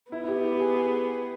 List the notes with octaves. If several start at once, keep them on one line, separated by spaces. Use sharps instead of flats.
B3 E4
E4
G4
G4
G#4
G#4